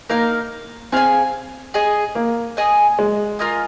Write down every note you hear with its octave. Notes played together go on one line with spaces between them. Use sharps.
A#3 D#4 A#4 F5
C4 G#4 F5 G#5
G#4 D#5 G#5
A#3
G#4 D#5 G#5
G#3
F4 A#4 D#5 G#5